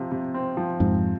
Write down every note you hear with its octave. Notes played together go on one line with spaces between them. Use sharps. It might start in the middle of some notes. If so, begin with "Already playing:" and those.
Already playing: C3 F3
C3
C4
F3
F2 G#2 C3